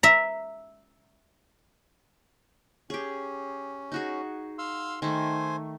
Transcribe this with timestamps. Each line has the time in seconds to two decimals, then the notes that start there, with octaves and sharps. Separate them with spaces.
0.03 E5 A#5
2.90 C#4 G4 G#4
3.92 D#4 F#4 G#4
4.58 F5 C6 E6
5.02 D#3 A3 C5 G#5